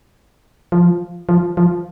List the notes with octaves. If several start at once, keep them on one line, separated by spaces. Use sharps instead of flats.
F3
F3
F3